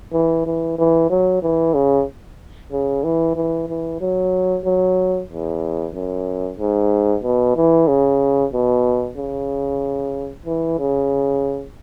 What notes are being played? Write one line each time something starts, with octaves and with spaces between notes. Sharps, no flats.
E3
E3
E3
F#3
E3
C#3
C#3
E3
E3
E3
F#3
F#3
E2
F#2
G#2
B2
E3
C#3
B2
C#3
E3
C#3